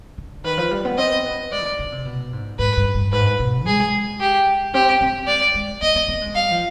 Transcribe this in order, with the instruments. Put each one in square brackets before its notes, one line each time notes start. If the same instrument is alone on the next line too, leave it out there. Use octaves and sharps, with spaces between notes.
[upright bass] D3
[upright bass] D#3 [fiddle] B4
[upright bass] F3
G3
B3
[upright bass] C4 [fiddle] D#5
[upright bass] B3
[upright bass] G#3 [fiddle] D5
[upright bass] B2
D3
C3
B2
G#2
[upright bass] G#2 [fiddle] B4
[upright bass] G2
G2
[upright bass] G#2 [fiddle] B4
[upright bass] B2
[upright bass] G#3 [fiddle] G#4
[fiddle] G4
[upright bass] C4 [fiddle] G4
[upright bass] C4
[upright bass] G#3 [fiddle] D5
[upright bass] G#3
[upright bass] B3 [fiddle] D#5
[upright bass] B3
B3
G#3
[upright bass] G3 [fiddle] F5
[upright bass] F3